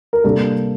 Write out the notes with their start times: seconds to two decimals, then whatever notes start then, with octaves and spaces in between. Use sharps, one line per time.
0.13 A#4
0.24 C3 G3 A#3 D4 A4